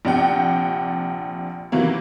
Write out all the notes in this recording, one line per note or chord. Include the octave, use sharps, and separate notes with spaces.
A#1 C3 D4 F#5 G5
C3 D#3 E3 F#3 A#3